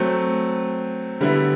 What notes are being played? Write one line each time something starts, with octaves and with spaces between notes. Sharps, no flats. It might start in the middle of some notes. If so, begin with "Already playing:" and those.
Already playing: F#3 A3 C4
D3 G3 B3 E4